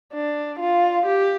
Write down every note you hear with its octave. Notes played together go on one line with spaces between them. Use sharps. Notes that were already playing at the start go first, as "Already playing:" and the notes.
D4
F4
G4